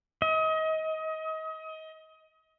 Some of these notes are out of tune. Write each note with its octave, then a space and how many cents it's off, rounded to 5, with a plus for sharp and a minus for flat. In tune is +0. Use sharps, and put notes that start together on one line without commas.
D#5 +30